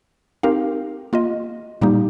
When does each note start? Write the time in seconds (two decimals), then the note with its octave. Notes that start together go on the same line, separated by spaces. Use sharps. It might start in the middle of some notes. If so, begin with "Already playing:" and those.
0.43 C4 D#4 G4 A#4 F5
1.13 A#3 F4 D#5
1.81 A#2 G3 A#3 D#4 G4